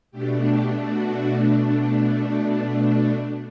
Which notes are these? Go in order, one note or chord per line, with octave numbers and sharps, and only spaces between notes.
B2 A3 D4 G4
G4
F#4